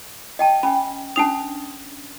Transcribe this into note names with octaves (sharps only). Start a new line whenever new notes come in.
D#5 G5 A5
C#4 G5 G#5 B5
C#4 D4 A5 D#6 C7 F7